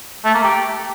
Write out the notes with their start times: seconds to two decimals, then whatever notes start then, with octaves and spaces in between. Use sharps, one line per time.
0.25 A3
0.34 A#3
0.44 G4